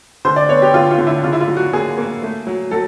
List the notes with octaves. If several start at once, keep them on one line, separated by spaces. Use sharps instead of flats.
D3 C5
D5
B3 C#5
G4
D3 F4
F4
D3
E4
C#3 F4
E4
F4
F#3
F#4
A#3 G#4
A#3
A3
F#3
F#3 A4